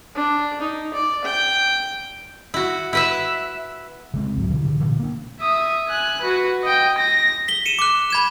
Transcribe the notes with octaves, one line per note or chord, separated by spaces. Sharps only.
D4
D#4
D5
G5
E4 F#4
E4 B4 E5
C#3 G#3 C4
C#2 G#2 F#3
B2 D3 E3
B2 D3
A#2 D3 E3
A#3 D4
E5 D#6
G#5 F#6
F#4 B4
D#5 G5
A#6
B6 G7
C#7 D#7 E7
D6 F#6
B5 G#6 E7